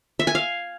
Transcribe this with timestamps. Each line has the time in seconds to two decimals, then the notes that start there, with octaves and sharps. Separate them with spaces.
0.19 E5
0.27 G#5
0.35 F5